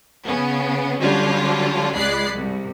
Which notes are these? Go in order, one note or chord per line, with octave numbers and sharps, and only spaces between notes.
C#3 B3 C#4
D3 F#3 G3 C#4 D4 F4
C#2 G#3 D5 B5 F#6 C7
C2